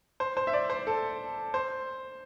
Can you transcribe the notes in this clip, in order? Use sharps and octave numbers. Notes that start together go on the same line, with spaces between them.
C5
C5
E5
D5
C5
A4
C5